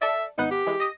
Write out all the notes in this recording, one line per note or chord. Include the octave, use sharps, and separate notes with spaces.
A4 D5 E5
G#1 B3 D#4 F#5
G4
E3 G#3
D#5 D#6 A#6